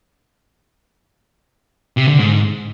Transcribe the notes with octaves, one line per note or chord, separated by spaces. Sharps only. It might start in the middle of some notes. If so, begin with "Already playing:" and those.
C3
D3
G#2